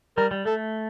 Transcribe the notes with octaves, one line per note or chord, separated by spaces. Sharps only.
G3 A#4
G3
A3 A4